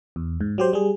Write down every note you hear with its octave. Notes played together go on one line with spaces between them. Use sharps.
E2
G#2
F#3 G4 C5
G3 G#4